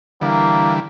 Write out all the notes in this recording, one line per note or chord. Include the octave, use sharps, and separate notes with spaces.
D3 E3 G3 A#3